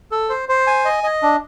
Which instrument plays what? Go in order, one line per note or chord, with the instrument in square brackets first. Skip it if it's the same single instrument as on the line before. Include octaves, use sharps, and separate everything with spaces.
[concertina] A4
C5
C5
G#5
D#5
D#5
D4